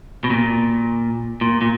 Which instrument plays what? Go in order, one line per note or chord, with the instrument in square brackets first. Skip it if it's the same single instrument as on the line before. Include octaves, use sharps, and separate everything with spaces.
[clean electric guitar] B2
A#2
A#2
A#2